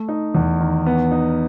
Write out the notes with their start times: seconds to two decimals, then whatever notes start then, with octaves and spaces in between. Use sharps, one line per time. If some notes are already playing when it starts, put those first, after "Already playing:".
Already playing: A3
0.09 D#4
0.35 E2
0.60 D#3
0.86 B3
1.11 D#4